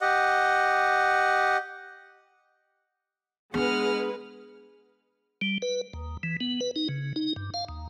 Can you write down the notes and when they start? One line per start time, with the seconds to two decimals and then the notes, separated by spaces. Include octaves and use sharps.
0.01 G4 D#5 F#5
3.54 G#3 B3 D4 G#4 B4 F#5 F6
5.41 G3
5.62 B4
5.93 D#2
6.23 E3
6.41 B3
6.61 B4
6.76 D#4
6.89 C#3
7.16 D#4
7.36 G2
7.54 F5
7.69 D#2